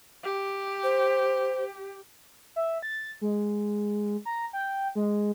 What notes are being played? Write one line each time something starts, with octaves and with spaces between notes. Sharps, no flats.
G4
C5
E5
A6
G#3
A#5
G5
G#3